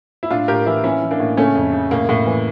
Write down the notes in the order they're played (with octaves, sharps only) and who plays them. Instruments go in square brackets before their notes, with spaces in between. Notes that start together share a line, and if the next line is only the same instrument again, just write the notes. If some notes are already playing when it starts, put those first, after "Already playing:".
[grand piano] E4
A2 D4 F4
A2 G4 A#4
E3 E4 G4
E3 C#4 E4
E3
A#3 D4
A2
C#3 A3 C#4
F2
C#3
A2 A#3
A2
E3